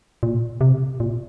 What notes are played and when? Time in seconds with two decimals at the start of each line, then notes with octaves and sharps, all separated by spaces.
0.23 A#2
0.61 C3
1.00 A#2